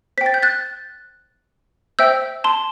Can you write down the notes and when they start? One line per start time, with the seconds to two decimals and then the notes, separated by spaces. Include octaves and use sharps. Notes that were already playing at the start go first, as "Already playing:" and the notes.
0.18 C5 G5 B6
0.26 A6
0.34 G6
0.43 F#6 A6
1.99 C5 E5 G5 E6 G6
2.44 A5 C6